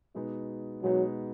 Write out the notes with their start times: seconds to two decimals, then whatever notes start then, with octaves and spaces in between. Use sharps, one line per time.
0.15 B2 G#3 B3 D#4
0.82 B2 F#3 G#3 B3 D#4